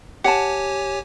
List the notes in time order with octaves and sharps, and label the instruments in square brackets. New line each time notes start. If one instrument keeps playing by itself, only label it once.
[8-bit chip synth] G4 C#5 G#5 [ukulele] F#5 A5